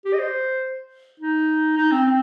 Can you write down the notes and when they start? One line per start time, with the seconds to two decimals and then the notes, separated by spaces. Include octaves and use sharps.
0.05 G4
0.14 D#5
0.19 C5
1.20 D#4
1.77 D#4
1.91 C4
2.06 C4